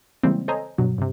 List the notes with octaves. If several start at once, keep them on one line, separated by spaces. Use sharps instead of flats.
C#3 E3 G3 G#3 A#3 C4
A4 C5 C#5 D#5 G#5 A#5
G2 B2 F#3
G2 C3